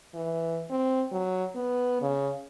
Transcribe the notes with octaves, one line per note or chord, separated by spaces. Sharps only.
E3
C4
F#3
B3
C#3